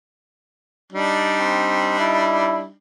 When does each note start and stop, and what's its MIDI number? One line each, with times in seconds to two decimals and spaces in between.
0.92 2.71 55
0.92 2.71 62
0.92 2.71 63
1.40 1.94 60
1.99 2.65 64